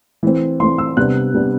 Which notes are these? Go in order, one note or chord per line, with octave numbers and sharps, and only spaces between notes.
E3 A3 C4
E3 A3 C4 C6
E6
C3 G3 B3 D4 F#6
C3 G3 B3 D4